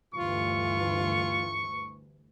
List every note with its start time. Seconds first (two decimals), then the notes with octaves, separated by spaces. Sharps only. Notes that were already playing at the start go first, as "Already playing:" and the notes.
0.14 D2 G2 E3 F4 C#6